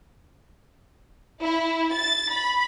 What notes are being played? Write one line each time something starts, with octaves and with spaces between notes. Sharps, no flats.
E4
A6
B5